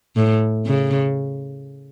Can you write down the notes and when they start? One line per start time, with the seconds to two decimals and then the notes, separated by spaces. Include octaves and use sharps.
0.16 A2
0.66 C#3